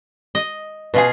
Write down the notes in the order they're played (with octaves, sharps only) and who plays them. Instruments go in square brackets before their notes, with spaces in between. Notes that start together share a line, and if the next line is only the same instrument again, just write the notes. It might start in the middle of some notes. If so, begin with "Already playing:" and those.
[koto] D#5
[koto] B2 F4 G#4 [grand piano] B4 G#5